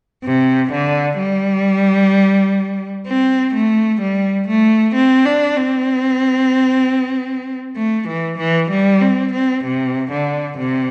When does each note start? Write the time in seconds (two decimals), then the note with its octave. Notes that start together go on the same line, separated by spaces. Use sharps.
0.24 C3
0.72 D3
1.19 G3
3.07 C4
3.54 A3
4.00 G3
4.48 A3
4.94 C4
5.25 D4
5.56 C4
7.76 A3
8.08 E3
8.38 E3
8.70 G3
9.01 C4
9.33 C4
9.64 C3
10.11 D3
10.58 C3